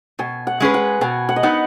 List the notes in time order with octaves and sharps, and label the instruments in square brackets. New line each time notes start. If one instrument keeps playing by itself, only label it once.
[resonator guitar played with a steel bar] B2 [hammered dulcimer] G#5
[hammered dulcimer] F#5
[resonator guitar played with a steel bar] G#3 C#4 G#4 B4
[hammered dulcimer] F#5
[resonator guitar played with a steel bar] B2 [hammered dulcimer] G#5
[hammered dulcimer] F#5
D#5
[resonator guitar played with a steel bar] B3 D#4 [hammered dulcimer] F#5